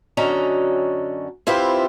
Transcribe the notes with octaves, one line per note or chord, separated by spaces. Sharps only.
F#2 D3 C#4 F#4 D#5 A#5
C4 E4 F4 G4 B4 C5